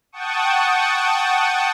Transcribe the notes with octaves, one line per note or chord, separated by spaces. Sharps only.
F#5 G5 A5 C#6 D#6